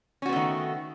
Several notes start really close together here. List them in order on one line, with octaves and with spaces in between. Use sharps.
C#4 F#4 B3 A3 D#3